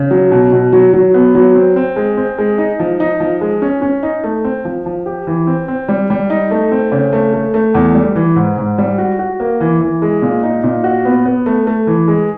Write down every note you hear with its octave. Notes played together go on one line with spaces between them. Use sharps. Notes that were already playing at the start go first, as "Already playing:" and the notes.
Already playing: C#3
F#3
B2
B2
F#3
F#3
B3
F#3
C4
C4
G#3
C4
G#3
D#4
F3
D#4
F3
G#3
C#4
C#4
D#4
A3
C4
F3
F3
G4
E3
C4
C4
G3
G3
D#4
A3
C4
C#3
A3
A3
A3
E2
G3
E3
G#2
G#2
G3
F#4
F#4
A#3
E3
E3
G#3
A#2
D#4
A#2
F#4
B3
B3
A3
A3
E3
G#3